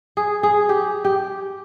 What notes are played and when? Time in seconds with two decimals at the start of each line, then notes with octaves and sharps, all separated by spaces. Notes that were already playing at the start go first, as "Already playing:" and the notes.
0.17 G#4
0.43 G#4
0.69 G4
1.05 G4